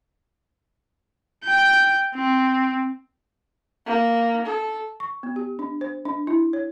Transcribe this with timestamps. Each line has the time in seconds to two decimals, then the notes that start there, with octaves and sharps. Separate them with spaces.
1.44 G5 G6
2.15 C4
3.86 A#3
4.46 A4
5.00 C#6
5.23 B3
5.36 G4
5.59 D4
5.81 C5
6.05 D4
6.27 E4
6.53 C#5